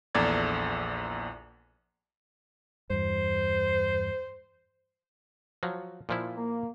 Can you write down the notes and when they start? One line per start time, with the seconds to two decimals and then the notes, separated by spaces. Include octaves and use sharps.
0.15 A#1 E2 A4 D5 G#6
2.90 E2 G2 C5
5.63 F3 F#3
6.09 A#2 F3 E4
6.37 A#3